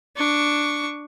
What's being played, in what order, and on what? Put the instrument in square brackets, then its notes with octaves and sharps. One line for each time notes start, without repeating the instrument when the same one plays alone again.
[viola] D4 C#6